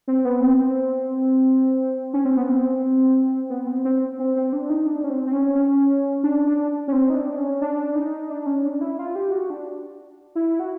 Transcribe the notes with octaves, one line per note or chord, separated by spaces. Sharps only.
C4
B3
C4
C4
C#4
C4
B3
C4
B3
C4
C4
C4
C4
D4
D#4
D4
C#4
C4
C4
C#4
C#4
D4
D4
C#4
C4
D#4
D4
C#4
D4
D#4
D4
C#4
D4
E4
F4
G4
F#4
D4
E4
F#4